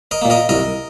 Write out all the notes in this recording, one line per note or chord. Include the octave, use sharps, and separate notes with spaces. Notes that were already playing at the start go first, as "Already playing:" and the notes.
A#4 D#5
A#2 A#3
A#4 D#5
C2 A#4 D#5